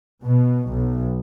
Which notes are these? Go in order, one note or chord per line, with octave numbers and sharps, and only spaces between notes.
B2
B1